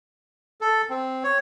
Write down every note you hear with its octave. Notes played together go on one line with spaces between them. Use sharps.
A4
C4
C#5